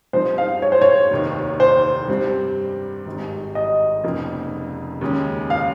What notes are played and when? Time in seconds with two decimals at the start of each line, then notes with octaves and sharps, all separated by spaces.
0.13 G2 F3 C4 D#4 C5
0.38 F5
0.62 C#5
0.72 C5
0.82 C#5
1.11 F1 D#2 D#3
1.60 C5
2.08 G2 G3 C4
3.06 G#1 G#2 G3
3.55 D#5
4.04 F1 F2 C#3 F3 A#3
5.01 D#2 C#3 G#3 C#4
5.50 F5